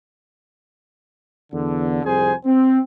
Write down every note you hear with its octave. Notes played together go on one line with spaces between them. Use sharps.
E2 D3
C2 F2 G#4 C5 G#5
C4